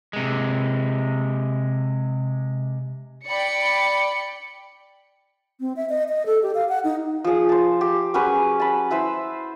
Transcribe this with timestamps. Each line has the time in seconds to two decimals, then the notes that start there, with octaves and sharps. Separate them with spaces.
0.13 C3 G#3
3.28 D5 G5 B5 C#7
5.60 C4
5.76 E5
5.89 D#5
6.09 D#5
6.26 A4
6.43 G4
6.54 F5
6.69 F#5
6.84 D#4
7.24 F3 G#4
7.49 C5 A5
7.81 G4
8.14 F#3 C#4 G#4 B4
8.60 A5 B5
8.91 E4 B4 C5 E6